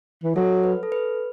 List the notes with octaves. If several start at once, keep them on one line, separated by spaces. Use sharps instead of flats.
E3
F#3 A4
B4
A4
B4